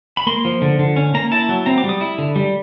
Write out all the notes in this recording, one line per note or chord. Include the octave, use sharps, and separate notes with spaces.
B5
A#3 C6
F3
D3
D3
C#4
A#3 A#5
E4 A5
F#3
C4 A#5
D6
G3
D#6
E4
D3
G3